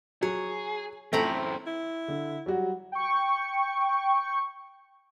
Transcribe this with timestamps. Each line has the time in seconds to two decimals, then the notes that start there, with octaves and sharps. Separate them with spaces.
0.23 F#3 G#4 C#5
1.13 F#2 E3 A3 C4 A4 A#5 B5
1.67 E4
2.08 D3
2.46 F#3 G3 F#4
2.92 G5 C#6